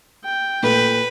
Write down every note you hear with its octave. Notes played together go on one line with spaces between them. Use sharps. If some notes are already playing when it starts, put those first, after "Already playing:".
G5
A#2 A3 B4